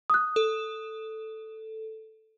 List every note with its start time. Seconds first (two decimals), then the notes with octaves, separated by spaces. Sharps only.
0.10 D#6 F#6
0.36 A4